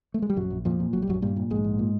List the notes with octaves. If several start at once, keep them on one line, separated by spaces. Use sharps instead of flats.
A3
G#3
G3
A#1 F#2 F#3
A#1
F2 A#2 F3
A#2
A#1 F#3
G3
A#1 F#2 F#3
G2 A#2 G3
A#2
A#1 G#2 G#3
A#1
A#2